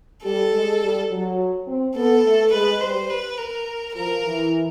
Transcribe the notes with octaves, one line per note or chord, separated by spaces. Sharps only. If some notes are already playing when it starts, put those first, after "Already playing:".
G3 A4
G#3
G3
F#3
C4
B3 A4
A3
G#3 B4
G3 C5
B4
A#4
F3 A#4
E3